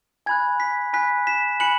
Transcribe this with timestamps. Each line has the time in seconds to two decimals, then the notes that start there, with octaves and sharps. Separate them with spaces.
0.26 G#5 B5 F#6 G#6
0.60 B6
0.93 G#5 B5 F#6 B6
1.27 B6 E7
1.60 G#5 B5 F#6 C#7 F#7